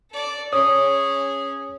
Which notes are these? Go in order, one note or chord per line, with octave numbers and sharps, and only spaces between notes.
A4 D5
C#4 G#4 C#5 D#6